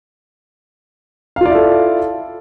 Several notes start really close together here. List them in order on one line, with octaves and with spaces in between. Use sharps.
F5 F4 D5 E4 A4